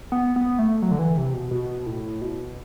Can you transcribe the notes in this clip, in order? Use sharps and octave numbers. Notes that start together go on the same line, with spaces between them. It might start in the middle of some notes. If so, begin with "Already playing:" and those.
B3
B3
A3
F#3
D3
E3
C3
B2
B2
A2
B2